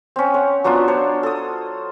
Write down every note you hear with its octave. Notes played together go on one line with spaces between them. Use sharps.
C4 C#4
C#5 F#5
F#3 B3 D4 F4
D4 C5 C#5
A4 D#6